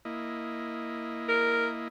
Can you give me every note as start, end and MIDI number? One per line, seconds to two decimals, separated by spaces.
0.05 1.88 58
0.05 1.88 64
0.05 1.88 75
1.29 1.68 70